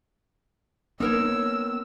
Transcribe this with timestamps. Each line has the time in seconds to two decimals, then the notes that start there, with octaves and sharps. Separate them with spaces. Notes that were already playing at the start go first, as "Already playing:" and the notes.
1.00 A#3 B3 C#4 D#4 A#4 C#5 E6